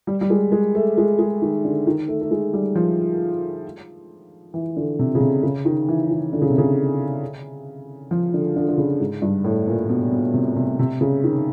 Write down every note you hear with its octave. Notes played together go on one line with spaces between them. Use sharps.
G3
G3
G#3
G#3
A3
G#3
G#3
D#3
D3
D#3
A3
A3
G#3
G3
F3
E3
D3
C3
C#3
C3
C#3
D#3
E3
D#3
D3
C#3
C3
C#3
F3
D3
D3
D3
C#3
G#2
G2
A2
A#2
B2
B2
C3
C3
C3
C#3
D#3